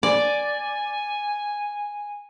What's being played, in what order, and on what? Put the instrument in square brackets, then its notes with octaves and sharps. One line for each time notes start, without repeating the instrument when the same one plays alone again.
[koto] D5 [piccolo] G#5